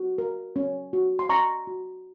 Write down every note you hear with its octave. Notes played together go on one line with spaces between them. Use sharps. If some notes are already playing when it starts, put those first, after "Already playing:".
Already playing: F#4
A#4
C#4
F#4
C6
C#4 A#5 C#6
F#4